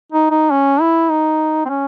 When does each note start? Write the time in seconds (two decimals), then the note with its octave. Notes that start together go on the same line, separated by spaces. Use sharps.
0.12 D#4
0.31 D#4
0.51 C#4
0.81 E4
1.11 D#4
1.65 C4
1.69 C#4